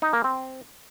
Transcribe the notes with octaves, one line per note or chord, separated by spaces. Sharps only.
D#4
A#3
C4